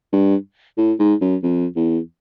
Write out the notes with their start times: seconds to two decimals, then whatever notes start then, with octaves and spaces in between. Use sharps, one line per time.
0.13 G2
0.78 A2
0.99 G#2
1.21 F#2
1.43 F2
1.76 E2